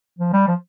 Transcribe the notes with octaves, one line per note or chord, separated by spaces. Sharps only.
F3
G3
F3